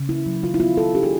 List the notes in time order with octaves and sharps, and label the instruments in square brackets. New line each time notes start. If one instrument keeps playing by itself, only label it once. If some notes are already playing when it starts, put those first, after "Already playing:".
Already playing: [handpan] C#3
A#3 E4
F#3
D#3 F4
E4
B3 F4
B3 A4
D4 G4
G#4